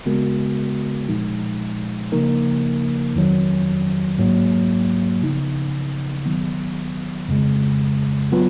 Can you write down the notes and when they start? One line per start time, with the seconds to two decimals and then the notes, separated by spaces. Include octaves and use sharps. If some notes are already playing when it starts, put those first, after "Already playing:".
0.06 C#3 G#3 B3 F#4 A#4
1.08 A#2 F3 G#3 D#4
2.12 C#3 F3 A#3 D#4 A#4
3.15 F2 D#3 F#3
4.18 G#2 F#3 A#3
5.22 C#3 F3 B3 D#4
6.25 D#3 F#3 B3
7.28 F2 C#3 G#3
8.32 F#3 B3 F4 B4